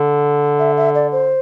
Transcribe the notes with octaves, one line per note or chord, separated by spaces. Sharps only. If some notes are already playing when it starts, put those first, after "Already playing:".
Already playing: D3
E5
E5
D5
C5